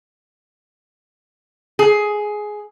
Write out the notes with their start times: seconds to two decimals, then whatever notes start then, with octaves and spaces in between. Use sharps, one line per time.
1.79 G#4